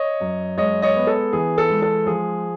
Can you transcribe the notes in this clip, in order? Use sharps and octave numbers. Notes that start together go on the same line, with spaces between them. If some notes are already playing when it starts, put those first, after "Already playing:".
Already playing: C#5 D#5
F#2
G#3 C#5 D#5
C#5 D#5
B3
A4
E3 G#4
A4
G#3
A4
F3 G#4